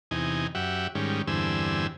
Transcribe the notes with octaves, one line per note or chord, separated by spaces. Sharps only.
E2 C3 D#4 G#5
F#2 G4 E5 F#5
G#2 D#3 G3 C#4
E2 G2 D3 C4 G#5 E6